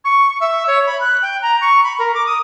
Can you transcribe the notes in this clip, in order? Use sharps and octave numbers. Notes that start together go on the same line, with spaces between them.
C#6
E5
C#5
B5
F#6
G5
A#5
C#6
B5
A#4
D6
D#6